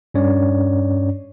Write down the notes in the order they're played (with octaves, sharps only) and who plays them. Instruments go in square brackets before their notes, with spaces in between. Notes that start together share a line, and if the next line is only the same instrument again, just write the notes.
[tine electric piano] G2 C#4 C#5 D5